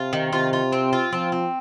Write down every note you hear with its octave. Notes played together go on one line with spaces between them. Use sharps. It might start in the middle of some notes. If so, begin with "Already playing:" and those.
Already playing: C3 F4
D#3
C3 F4
F4
C4
F4
F3 C4
C4